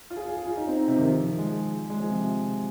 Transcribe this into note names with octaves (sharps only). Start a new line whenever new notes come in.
F4
G#4
G#4
G#4
F4
D#4
C4
D#4
C3
D#3
F3
G#3
G#3
F3
C3